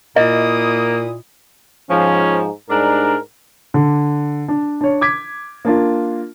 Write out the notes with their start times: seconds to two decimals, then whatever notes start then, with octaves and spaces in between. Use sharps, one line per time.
0.16 A#2 A#3 E4 D#5 D#6
1.90 G#2 F3 C#4
2.70 G#2 G3 D4 A#4
3.74 D3
4.48 D4
4.81 D4 C#5
5.01 D6 G#6 B6
5.65 A#3 D4 F4